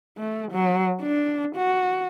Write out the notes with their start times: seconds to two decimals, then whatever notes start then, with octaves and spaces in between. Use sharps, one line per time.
0.18 A3
0.52 F#3
1.01 D4
1.56 F#4